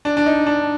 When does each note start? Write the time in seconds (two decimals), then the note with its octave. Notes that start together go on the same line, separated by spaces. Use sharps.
0.05 D4
0.17 D4
0.26 D#4
0.47 D4